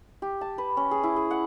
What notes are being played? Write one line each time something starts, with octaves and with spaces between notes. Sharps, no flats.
G4
A5
B4
C#4
G#4
E4
G#4
F#5